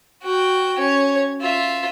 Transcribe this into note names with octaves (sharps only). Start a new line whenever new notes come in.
F#4 G5
C#4 C#5
F4 E5